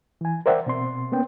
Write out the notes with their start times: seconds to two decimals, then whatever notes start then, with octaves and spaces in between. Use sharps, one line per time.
0.21 E3 G#5
0.46 A#4 C5 D5 E5 F#5 G5
0.66 B2 C4 C6
1.12 A#3 B3 C#4 G5